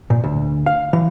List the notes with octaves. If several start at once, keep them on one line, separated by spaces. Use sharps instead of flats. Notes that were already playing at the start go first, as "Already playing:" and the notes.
A#2
D2
F5
E3